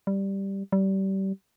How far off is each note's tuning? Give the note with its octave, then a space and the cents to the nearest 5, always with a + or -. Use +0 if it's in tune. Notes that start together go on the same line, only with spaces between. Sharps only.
G3 +0
G3 -25